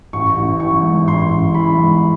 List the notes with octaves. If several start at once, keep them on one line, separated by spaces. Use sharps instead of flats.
A1 C#6
A1
E3 C#6
G#2
A1 C6
A1
E3 B5
G#2